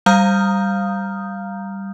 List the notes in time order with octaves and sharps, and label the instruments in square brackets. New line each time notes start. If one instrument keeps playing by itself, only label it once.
[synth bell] G3 F5 A#5 D#6 F6 G6